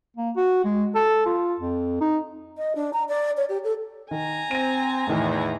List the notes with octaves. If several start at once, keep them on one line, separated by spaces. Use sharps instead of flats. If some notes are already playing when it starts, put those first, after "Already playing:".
A#3
F#4
G#3
A4
F4
F2
D#4
D#5
D4
A#5
D5
C#5
G4
A4
D#3 G#5 A#5
C4 A#6 D#7
E2 A2 D#3 E3